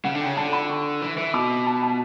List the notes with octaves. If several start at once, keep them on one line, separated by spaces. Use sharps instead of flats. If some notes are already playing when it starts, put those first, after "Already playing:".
C#3 F#5
D3
C#3 G5
D3 A5
B5
C#6
E3
E3
B2 D6
A5
A5